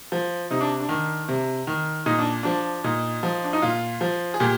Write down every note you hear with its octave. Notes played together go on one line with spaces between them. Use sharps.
F3
C3 D#4
D4
D4
D#3
C3
D#3
A#2 D#4
D4
F3 D4
A#2 D#4
F3
D4
D#4
A#2 F4
F3
G#4
A#2 G4